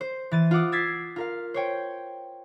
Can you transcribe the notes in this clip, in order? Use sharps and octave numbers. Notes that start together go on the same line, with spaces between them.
C5
E3 A6 D#7
F4 F#5 D6 D#6
E6 G#6 A6 B6 C7
F4 A#4 F5
C5 C#5 G5